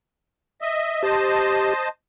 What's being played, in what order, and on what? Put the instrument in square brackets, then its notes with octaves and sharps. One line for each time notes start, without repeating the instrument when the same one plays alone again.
[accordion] D#5 E5
[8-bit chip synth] G4 [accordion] C5 D#5 A5